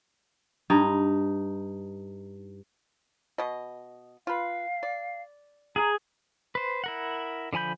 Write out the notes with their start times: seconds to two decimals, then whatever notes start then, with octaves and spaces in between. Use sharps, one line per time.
0.70 G2 D#4
3.38 B2 D#5
4.27 F4 B4 F5
4.83 D5
5.76 G#4 A#5
6.55 B4 C5
6.84 E4 A#4 F#5
7.53 D3 F3 G#5 B5 G6